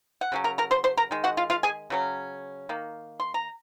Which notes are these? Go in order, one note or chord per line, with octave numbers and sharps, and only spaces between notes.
F#5
C#3 F#3 C#4
A#4 A#5
A#4 A#5
C5 C6
C5 C6
A#4 A#5
D#3 G#3
F#4 F#5
F4 F5
F4 F5
G#4 G#5
C#3 F#3 C#4
D#3 A#3
C6
A#5